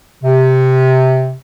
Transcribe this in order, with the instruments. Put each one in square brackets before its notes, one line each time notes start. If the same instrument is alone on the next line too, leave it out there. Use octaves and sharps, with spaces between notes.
[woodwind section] C3